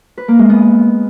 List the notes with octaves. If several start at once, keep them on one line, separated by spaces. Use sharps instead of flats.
B4
A#3
G#3
B3